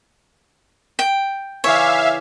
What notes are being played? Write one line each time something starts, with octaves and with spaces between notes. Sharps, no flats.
G5
C#3 E3 C#5 D5 E5 F5